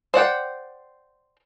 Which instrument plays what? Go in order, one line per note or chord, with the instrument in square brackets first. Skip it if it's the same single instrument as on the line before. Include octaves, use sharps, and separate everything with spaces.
[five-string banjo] C5 D5 F#5 G5